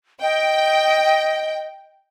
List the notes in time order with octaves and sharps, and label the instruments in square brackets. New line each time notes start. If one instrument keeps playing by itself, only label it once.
[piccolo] D#5 [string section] G5